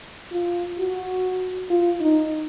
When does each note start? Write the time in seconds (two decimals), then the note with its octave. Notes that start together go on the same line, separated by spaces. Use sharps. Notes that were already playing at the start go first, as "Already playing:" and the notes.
0.32 F4
0.79 F#4
1.70 F4
2.01 D#4